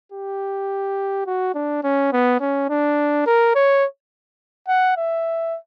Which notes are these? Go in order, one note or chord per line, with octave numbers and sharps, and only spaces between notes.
G4
F#4
D4
C#4
B3
C#4
D4
A#4
C#5
F#5
E5